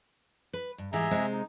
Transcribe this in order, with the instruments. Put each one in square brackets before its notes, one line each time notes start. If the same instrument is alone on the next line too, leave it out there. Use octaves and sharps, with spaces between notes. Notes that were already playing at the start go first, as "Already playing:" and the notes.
[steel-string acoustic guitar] B4
G2
[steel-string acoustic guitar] G#2 E3 G4 [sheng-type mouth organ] G#4 E5 A#5
[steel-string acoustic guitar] C3 G#3 C4
[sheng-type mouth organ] D#4